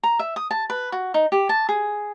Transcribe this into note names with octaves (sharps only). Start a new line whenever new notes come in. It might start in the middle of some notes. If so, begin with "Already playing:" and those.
A#5
E5
D#6
A5
B4
F#4
D#4
G4
A5
G#4